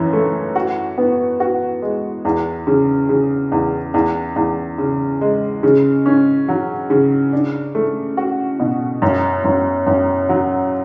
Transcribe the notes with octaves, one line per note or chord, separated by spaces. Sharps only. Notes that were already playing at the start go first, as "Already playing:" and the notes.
Already playing: F#2 E3
A3
F#4
B3
F#4
G#3
E2
C#3
C#3
E2
E2
E2
C#3
G#3
C#3
C#4
F#3
C#3
D4
A3
F#4
B2
F#2
F#2
F#2
F#3